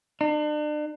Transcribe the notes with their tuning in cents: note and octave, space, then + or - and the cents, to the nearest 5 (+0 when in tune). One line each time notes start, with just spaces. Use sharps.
D4 +40